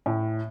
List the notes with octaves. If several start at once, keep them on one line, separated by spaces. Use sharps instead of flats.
A2